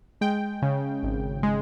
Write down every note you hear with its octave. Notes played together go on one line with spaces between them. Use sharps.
G#3 G5
C#3
G#1
G#3